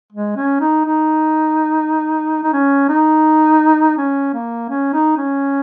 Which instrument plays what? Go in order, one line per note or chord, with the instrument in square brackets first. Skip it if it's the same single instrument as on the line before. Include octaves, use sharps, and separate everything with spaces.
[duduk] G#3
C#4
D#4
D#4
D#4
C#4
D#4
C#4
A#3
C#4
D#4
C#4